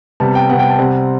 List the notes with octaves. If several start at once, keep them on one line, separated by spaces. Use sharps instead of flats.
C3 G3 B3 A5
G5
C3 G3 B3 F#5
G5
A5
C3 G3 C4 F#5